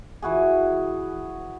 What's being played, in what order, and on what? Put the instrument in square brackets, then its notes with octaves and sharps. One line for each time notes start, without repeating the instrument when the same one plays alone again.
[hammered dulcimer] E3 F#4 G#4